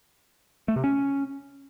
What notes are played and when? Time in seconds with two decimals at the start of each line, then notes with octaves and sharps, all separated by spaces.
0.68 A3
0.76 C3
0.84 C#4